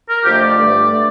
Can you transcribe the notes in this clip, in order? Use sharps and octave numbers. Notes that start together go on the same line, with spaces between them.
A#4
F2 D3 F3 A3 G4
D5
G2 D3 A3
D3 A3